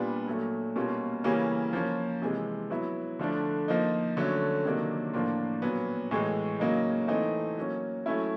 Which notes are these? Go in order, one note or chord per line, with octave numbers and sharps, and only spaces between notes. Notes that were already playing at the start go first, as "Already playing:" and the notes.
Already playing: A#2 G3 B3 D4 F4
A#2 F#3 A3
B2 G3 A#3 C#4 F4
C#3 E3 G3 A#3 C#4
F3 A#3 C#4
C3 E3 G#3
F#3 B3 E4
D3 F3 A3 D4
F3 A#3 D#4
D3 F#3 A3 C#4
C3 D#3 F#3 A#3 D4
A2 F3 A#3 D4 F4
A#2 F#3 B3
A2 E3 G#3
C#3 F#3 A#3 D#4
E3 A3 C4 D#4
F#3 A#3 C#4
F#3 A3 C#4 E4